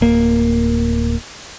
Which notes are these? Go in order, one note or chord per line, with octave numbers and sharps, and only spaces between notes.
D1 A#3